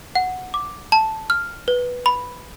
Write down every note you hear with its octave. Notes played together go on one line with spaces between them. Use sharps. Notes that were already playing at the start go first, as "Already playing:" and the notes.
F#5
D6
A5
F6
B4
B5